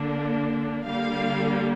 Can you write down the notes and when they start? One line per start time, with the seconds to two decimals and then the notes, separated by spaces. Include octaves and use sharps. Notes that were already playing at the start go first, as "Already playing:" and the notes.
Already playing: D3 A#3 D4
0.85 D3 G3 A#3 F5